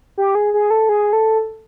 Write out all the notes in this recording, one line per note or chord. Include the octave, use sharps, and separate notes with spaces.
G4
G#4
G#4
A4
G#4
A4